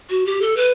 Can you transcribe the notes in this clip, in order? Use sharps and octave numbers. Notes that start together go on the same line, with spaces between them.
F#4
G4
A4
B4